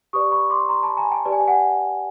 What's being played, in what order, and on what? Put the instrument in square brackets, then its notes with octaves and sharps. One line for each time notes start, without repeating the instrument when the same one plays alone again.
[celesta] G4 B4 D5 C#6 D#6
B5 C#6
C6 D6
A#5 C6
A5 B5
G#5 A#5
G5 A5
G4 B4 D5 A5
G#5
G5
F#5 G#5